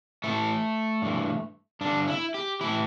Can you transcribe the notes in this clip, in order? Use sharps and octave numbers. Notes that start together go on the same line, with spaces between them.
A2 E3 A3
G2 E3
G2 D4
D3
E4
G4
A2 E3 E4